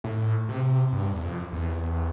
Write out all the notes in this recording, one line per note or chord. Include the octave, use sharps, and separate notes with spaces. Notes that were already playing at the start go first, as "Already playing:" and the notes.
A2
C3
G2
E2
F2
E2